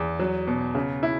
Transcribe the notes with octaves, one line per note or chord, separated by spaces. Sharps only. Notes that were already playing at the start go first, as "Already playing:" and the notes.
Already playing: E2
F#3
B2
C#3
E4